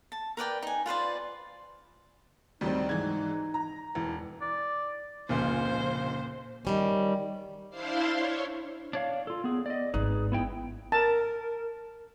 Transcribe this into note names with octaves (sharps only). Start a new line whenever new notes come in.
A5
A#4 B4 D5 G5
D#4 G#5
F4 B4 C5 D5
D2 D#3 F#3 G3 C4 D#4
G#2 E3 G#6
A#5
E1 E3
D5
F1 C#2 A#2 C5 G#5
D#3 G3 C#4
D4 E4 C5 F5 C6
C#5
D4 C#5 F5
F4 A4
B3 G#4
D5 D#5
G#1 D#4 G#4 B4
B3 E4 G5
A#4 A5